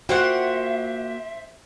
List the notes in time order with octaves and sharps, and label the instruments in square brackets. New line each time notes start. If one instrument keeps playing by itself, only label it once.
[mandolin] A#3 F4 F#5 [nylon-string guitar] F#4 [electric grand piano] C5 G5 [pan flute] E5